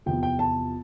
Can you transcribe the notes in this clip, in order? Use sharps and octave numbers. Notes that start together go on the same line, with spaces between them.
E2 C3 F3 G5
G5
A5